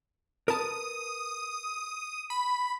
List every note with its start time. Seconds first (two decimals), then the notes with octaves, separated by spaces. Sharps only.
0.48 A#4 B4 A5 D#6
2.30 B5